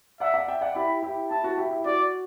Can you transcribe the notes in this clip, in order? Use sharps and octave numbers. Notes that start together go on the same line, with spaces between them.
D5 E5 F#5
D5 F#5
E5 G5
D5 F#5
E4 G4 B5
E4 G4
E4 A5
F#4
E4 G4
E4
F#4 D5